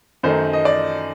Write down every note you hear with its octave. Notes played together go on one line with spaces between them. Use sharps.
F#2 D#3 A3 D#4 C5
D#5
D5